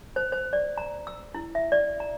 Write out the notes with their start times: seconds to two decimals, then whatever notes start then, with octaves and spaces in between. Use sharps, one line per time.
0.16 C5
0.32 C5
0.53 D5
0.78 A#5
1.07 E6
1.35 E4
1.55 E5
1.72 D5
2.00 A#5